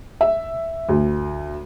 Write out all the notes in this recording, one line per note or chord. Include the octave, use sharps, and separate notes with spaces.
E5
D2